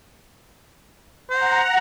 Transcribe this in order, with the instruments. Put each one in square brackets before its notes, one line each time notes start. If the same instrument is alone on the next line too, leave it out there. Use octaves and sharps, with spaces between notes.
[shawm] C5 [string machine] F#5 A#5